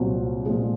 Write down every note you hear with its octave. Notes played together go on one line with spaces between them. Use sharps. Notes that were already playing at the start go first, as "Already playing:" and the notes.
Already playing: C2 A#2 F#3 C4
A#2 F3 G#3